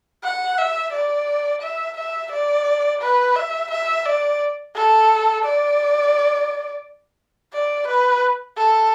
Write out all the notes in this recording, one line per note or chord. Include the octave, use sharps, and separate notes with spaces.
F#5
E5
D5
E5
E5
D5
B4
E5
E5
D5
A4
D5
D5
B4
A4